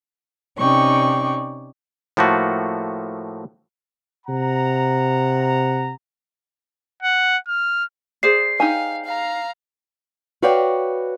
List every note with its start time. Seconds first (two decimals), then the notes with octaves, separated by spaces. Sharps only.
0.58 C3 C#4 D#4 D5 G5 C#6
2.17 A2 F3 A3 A#3 F#4
4.27 C3 F#5 A#5
7.03 F#5
7.48 F6
8.23 G#4 C5 D5 C7
8.60 D#4 G4 F5 G#5
9.05 F5 A#5
10.42 F#4 B4 C#5 D5 F5 G5